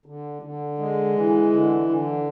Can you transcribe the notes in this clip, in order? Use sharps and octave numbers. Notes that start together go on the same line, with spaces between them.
D3
D3
G#3
E3
D3
D3